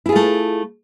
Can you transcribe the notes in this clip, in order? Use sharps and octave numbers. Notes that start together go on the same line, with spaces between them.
A3 E4 F4 G#4